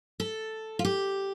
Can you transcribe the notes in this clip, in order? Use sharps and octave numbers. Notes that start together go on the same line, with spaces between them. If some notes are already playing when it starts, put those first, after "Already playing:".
A4
F4
G4